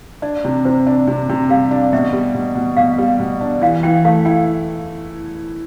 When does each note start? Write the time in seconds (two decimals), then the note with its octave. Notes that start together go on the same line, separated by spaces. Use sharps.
0.22 D4 D5
0.45 C3
0.65 C3 C5
0.87 D4
1.07 C3
1.29 C3
1.49 G3 F5
1.71 D4
1.93 B2 E5
2.13 G3
2.35 B2
2.55 B2
2.77 B2 F5
2.98 G3
3.20 B2
3.41 D4
3.61 E3 F5
3.83 E3 G5
4.05 A3 F5
4.25 E4 G5